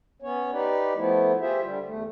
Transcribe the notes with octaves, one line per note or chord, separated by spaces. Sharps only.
B3 C#4 C#5
D#4 G4 B4 D5
F3 A3 B3 E4
F4 G4 G#4 C5 E5
D3 G3
E2 A3